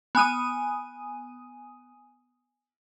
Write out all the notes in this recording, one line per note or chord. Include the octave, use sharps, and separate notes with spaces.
B3 G#5 D#6 D#7